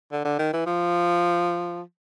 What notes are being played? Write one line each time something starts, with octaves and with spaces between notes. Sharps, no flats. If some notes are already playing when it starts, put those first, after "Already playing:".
D3
D3
D#3
E3
F3